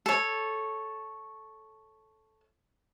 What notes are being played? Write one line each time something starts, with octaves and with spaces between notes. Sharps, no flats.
A4 C#5